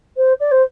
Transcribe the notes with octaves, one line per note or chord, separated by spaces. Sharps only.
C5
D5
C5